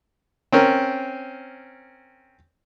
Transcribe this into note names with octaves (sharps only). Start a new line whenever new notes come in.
C4 C#4 A#4